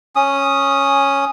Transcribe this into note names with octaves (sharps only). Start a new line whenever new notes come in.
C#4 D#6